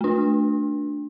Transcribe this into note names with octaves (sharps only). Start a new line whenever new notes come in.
A3 D4